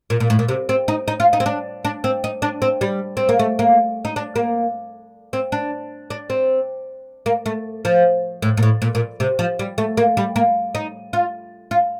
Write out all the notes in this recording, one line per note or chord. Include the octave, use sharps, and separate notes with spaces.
A#2
A#2
A2
A#2
C3
C4
D#4
D#4
F4
D#4
C4
D4
D4
C4
D#4
D4
C4
G3
C4
A#3
A3
A#3
D#4
D4
A#3
C4
D4
D4
C4
A#3
A3
F3
A2
A#2
A2
A#2
A#2
C3
F3
G3
A3
A#3
G3
A#3
D#4
F4
F4